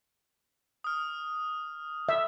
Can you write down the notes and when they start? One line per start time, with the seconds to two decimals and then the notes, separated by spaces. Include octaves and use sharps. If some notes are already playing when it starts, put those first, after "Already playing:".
0.84 D#6 F6
2.09 E5